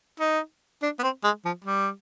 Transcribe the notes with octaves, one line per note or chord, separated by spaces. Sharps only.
D#4
D4
B3
C4
G#3
F3
G3